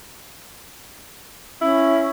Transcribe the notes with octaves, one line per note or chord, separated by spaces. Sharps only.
C#4 E4